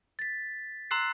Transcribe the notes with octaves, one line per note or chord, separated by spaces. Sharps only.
A6 B6
A#5 C6 E6 F#6 C7